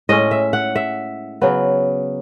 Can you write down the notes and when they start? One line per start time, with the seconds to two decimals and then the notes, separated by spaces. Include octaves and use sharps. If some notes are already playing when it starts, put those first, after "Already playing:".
0.09 A2 G#3 C#4 D#5
0.31 E5
0.53 F#5
0.76 E5
1.42 C#3 F#3 B3